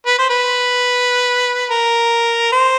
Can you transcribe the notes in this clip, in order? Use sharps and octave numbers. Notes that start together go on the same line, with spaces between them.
B4
C5
B4
A#4
C5